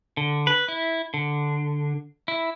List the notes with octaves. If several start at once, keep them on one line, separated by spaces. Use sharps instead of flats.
D3
B4
E4
D3
E4